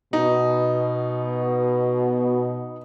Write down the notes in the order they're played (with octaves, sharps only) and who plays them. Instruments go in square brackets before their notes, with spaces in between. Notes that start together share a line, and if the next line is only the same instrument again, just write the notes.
[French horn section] B2 [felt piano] D#4